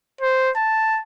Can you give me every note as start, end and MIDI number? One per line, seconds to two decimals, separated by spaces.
0.21 0.51 72
0.56 1.01 81